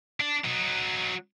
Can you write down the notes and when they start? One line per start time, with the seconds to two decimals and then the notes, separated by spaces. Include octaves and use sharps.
0.21 D4
0.45 F#3 D#4